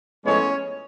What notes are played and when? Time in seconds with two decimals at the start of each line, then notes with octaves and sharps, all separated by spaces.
0.25 A2 F3 G#3 B3 C#4 C#5